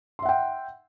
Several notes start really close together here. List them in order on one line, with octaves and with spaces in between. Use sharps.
C6 E5 F#5 G5